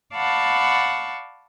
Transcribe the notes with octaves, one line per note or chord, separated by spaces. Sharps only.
D5 F5 F#5 A5 B5 C#6